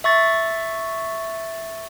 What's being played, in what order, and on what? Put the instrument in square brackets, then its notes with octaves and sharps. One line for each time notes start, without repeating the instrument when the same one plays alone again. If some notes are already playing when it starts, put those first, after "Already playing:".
[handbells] E5 C#6 A6